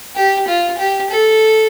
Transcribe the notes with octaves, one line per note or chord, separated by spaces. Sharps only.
G4
F4
G4
A4